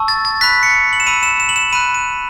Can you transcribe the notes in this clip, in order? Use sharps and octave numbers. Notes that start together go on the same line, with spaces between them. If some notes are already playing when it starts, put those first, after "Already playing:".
Already playing: A5 C#6 E6
A6
A6
B5 F#6 B6
C#7
F#7
E7
B5 E6 D#7
E7
E7
F#7
E7
B5 F#6 D#7
D#7